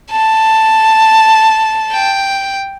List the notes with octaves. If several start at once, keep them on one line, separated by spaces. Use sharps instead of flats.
A5
G5